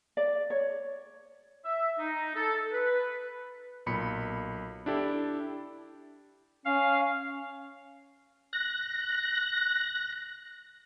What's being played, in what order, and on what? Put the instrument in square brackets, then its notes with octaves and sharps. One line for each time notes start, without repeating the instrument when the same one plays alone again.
[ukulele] D5
C#5
[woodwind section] E5
D#4
A4
B4
[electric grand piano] B1 A#2 B5 C#7
D4 E4 G4 A4
[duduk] C#4 [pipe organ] F5
[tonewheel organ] F#6 A#6